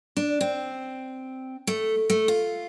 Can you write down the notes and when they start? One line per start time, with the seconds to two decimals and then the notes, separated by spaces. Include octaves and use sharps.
0.17 D4
0.41 C4
1.67 A3
2.10 A3
2.28 F4